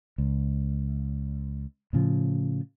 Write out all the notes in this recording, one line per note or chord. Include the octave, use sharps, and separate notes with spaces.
C#2
A2 C#3 F3